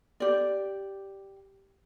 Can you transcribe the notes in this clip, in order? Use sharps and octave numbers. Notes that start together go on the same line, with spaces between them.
G4 D5